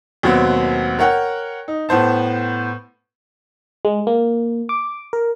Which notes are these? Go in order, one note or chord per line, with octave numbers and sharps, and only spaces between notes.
D#2 B2 F#3 B3 C4
A#4 C#5 F#5 G5
D#4
A2 B3 C5 A5
G#3
A#3
D6
A#4